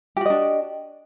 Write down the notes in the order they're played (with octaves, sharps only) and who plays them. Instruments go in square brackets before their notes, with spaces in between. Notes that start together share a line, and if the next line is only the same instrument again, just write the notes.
[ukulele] G4
F#4
D#5
D4